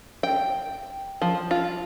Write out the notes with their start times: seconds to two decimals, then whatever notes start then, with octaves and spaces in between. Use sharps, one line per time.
0.23 G5
1.22 F3
1.51 F4